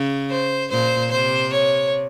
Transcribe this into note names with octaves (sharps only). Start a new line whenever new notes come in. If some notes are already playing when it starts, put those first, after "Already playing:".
Already playing: C#3
C5
A#2 C5
C3 C5
C#5